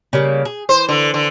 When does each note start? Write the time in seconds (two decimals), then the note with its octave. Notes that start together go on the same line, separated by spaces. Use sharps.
0.13 C#3 G3 A#3
0.45 G#4
0.69 E3 C5
0.89 D3
1.14 D3